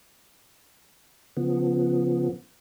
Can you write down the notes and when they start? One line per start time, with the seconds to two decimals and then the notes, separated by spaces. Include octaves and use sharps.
1.37 C#3 F3 B3